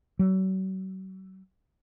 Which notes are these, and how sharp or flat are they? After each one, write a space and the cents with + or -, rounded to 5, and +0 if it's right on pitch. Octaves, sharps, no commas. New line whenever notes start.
F#3 +40